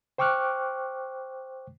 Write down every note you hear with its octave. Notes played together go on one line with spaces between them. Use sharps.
C5 G5 C#6 D6 F6 F#6